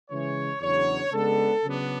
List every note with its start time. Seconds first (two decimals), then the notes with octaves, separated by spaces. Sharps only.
0.10 C#3 E3 G#3 C#5
0.61 E2 C#3 F#3 B3 D4 C#5
1.12 C#3 G#3 B3 D4 A4
1.64 C#3 F#3 B3 D4